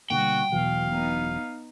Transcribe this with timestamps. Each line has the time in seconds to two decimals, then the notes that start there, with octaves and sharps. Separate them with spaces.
0.10 B2 D3 G3 A#3 F#4 G5
0.52 E1 B2 E3 F#3 F5
0.91 B3 D#4